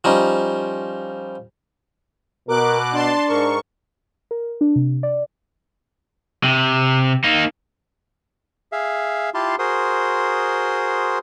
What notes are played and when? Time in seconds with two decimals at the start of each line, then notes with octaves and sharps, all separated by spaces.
0.04 F3 G3 C#4 D#4
2.49 B2 A#4 D6 F#6
2.94 D4 A5 C6
3.28 G#2 A#4 C#6
4.31 A#4
4.61 D4
4.76 C3
5.03 D5
6.44 C3
7.24 A#3 D#4
8.72 G#4 E5 F5
9.34 E4 F4 G4 F5 A5 C6
9.59 F#4 G#4 A#4 C5 C6 D#6